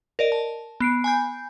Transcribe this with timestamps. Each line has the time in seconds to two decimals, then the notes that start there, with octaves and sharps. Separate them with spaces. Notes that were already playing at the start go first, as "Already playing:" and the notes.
0.19 A#4 D5 D#5
0.32 A5
0.80 B3 C7 D7
1.04 G#5 B5 G6